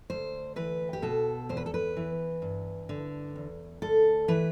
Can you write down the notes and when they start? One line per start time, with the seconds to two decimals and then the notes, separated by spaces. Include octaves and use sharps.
0.10 D2 C5
0.56 E3 B4
0.93 G4
1.02 B2 A4
1.49 E2 C5
1.57 B4
1.66 A4
1.74 B4
1.96 E3
2.42 G2
2.89 D3
3.36 E2
3.82 D2 A4
4.28 E3 B4